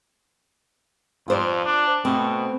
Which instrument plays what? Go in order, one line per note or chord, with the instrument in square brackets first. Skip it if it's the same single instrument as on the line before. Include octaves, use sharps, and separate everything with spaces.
[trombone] F2 [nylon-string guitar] F4 C5 D5
[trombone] D4
[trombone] B2 [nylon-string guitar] A3 C4